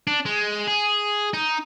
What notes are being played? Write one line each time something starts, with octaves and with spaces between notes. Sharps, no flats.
D4
G#3
G#4
D#4